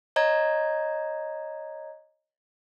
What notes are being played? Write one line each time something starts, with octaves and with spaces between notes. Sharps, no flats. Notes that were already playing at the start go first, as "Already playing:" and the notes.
C#5 D#5 A#5 G#6